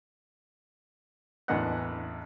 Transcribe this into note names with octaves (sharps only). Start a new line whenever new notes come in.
A1 E2 D4 D#5 F#5 F#6